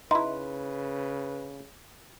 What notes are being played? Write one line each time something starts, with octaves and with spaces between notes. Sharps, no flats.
C#3 D#4 E4 B4 C6